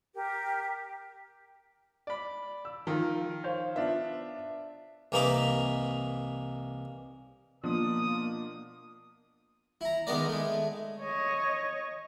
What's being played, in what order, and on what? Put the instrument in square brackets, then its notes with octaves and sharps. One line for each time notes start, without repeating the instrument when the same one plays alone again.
[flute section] G4 A#4
[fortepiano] D5 B5
[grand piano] E6
[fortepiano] D#3 [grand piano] F3 F4 A#4
[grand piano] C5 C#5 F5
[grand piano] B3 D4 F4 [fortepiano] E5
[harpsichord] C2 E3 A#3 D#4 B5 D6
[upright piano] B2 F3 D4 [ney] A#3 [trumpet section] D5 D#6
[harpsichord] E4 A#5
D#3 G#3 B3 A#4 D5
G#3 A3
[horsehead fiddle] C#5 D#5